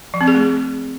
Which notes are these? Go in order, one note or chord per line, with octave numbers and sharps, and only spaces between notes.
F3
C4
G#4
A3